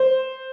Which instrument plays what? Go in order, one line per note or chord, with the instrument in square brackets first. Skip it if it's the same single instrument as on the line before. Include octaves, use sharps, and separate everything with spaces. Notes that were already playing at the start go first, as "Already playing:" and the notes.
Already playing: [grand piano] C5